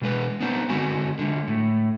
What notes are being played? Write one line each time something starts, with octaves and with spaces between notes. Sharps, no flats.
B2 G#3 B4
B3 C4 D4 D#4
D3 G#3 C4 F#4 G#5
D3 G#3
A2